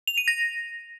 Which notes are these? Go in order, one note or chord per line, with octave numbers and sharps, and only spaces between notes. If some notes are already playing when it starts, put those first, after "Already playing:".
F7
D#7
A#6